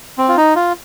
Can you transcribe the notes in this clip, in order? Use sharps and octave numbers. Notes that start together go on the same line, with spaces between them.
C4
F4
D#4
F4